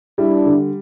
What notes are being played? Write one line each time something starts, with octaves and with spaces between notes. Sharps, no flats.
G3 D4 E4
D3